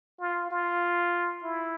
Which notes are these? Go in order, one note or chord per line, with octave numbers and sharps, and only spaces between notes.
F4
F4
E4